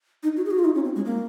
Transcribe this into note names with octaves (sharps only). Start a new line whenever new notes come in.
D#4
F#4
G#4
F#4
F4
D#4
C#4
C4
G#3
A#3